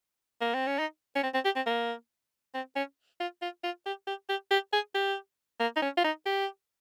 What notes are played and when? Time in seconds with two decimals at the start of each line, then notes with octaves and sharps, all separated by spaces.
0.41 A#3
0.54 C4
0.67 C#4
0.79 D#4
1.16 C#4
1.23 C4
1.34 C4
1.45 G4
1.56 C4
1.67 A#3
2.54 C4
2.76 C#4
3.20 F4
3.42 F4
3.64 F4
3.86 G4
4.07 G4
4.29 G4
4.51 G4
4.73 G#4
4.95 G4
5.60 A#3
5.76 D#4
5.82 C#4
5.97 F4
6.04 D#4
6.26 G4